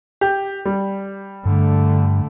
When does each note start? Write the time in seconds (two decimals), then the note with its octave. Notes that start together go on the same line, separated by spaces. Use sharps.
0.21 G4
0.65 G3
1.45 G2 D3 A3